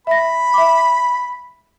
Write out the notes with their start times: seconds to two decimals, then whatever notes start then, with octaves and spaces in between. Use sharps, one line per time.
0.07 E5 B5 A#6
0.54 E5 D6